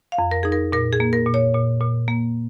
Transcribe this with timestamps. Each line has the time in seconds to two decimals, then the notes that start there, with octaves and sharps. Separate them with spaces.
0.12 F5
0.18 F2
0.31 A#4
0.43 D#4 G#4
0.52 A#4
0.72 A#2 A#4
0.93 G#4
1.00 A#3
1.13 A#4
1.27 A#2
1.34 C#5
1.54 A#2
1.81 A#2
2.08 A#3